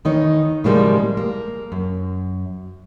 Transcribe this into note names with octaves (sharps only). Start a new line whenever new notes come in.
E2 D#3 D#4 C#5
A2 C#3 F3 G3 G#3 A#3
A#3
F#2